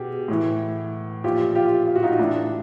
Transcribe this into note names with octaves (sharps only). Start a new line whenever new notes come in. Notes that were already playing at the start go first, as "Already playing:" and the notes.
Already playing: B2 G4 G#4
A2 E3
A#2 F3 F4 G4
F4 G4
F4
F#4
D#4 F4
A2 E3 D4 E4